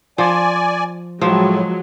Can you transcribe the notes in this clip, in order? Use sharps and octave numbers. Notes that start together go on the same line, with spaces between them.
F3 D5 G#5
A2 F3 F#3 G#3